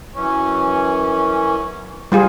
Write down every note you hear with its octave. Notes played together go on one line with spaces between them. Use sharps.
F#2 E3 C#4
G3 F4 G#4